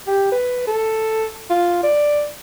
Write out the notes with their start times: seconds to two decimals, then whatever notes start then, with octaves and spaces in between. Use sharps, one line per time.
0.07 G4
0.32 B4
0.67 A4
1.50 F4
1.84 D5